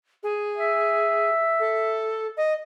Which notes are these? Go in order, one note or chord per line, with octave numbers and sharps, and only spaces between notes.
G#4
E5
A4
D#5